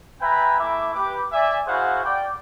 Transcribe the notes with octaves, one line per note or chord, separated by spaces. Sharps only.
B4 E5 G5 G#5 A#5 B5
A3 E4 E5 D6
G4 B4 D6
D5 E5 G#5
E4 F#4 G#4 C5 F5 F#5
D5 G5